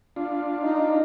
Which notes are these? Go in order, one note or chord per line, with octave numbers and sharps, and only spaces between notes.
D4 F4
D#4